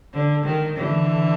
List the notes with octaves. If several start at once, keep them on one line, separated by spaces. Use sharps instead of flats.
D3
D#3
D3 E3